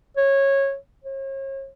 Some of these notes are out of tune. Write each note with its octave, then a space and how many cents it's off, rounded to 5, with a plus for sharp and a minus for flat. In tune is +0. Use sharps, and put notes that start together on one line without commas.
C#5 -15
C#5 -40